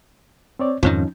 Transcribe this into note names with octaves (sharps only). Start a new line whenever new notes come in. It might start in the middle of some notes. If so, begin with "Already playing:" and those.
C4 C#5 D5
F2 G#2 D#3 F3 C#4 D#4